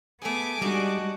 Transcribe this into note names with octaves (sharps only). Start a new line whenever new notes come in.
A3 B3 G#4 G#5 D6
G3 G#3 D4 D#4 F#4 G#4